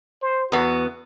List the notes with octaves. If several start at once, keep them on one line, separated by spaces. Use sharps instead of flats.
C5
E2 B3 F#4